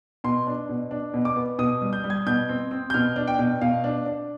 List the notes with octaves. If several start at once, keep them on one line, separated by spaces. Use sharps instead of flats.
B2 C6
D4
B2
D4
B2
D6
B3
B2 D#6
G3
G6
G3
G#6
B2 G6
C4
C4
G6
B2 F6
D4
G5
B2
B2 F5
D4
D4